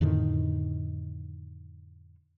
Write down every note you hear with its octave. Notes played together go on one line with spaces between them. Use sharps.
F2 A2 D3 D#3